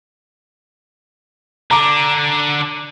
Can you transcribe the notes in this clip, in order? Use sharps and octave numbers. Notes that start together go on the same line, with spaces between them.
D3 D4 A#5 D6